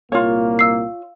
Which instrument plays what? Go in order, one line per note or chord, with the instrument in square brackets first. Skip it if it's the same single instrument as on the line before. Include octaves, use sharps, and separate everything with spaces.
[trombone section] C2 A#2 A#3 [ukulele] F4 C#5
[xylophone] F5 E6 C7